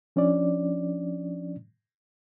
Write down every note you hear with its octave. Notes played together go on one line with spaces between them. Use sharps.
F3 C#4 D4 D5